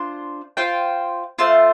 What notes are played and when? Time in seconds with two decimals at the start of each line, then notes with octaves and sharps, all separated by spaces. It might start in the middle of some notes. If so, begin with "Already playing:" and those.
Already playing: D4 F4 C5
0.57 F4 C5 G5
1.39 A3 F4 C5